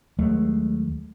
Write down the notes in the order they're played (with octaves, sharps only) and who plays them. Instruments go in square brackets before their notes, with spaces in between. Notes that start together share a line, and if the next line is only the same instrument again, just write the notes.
[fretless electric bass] D#2 F#3 G#3 A3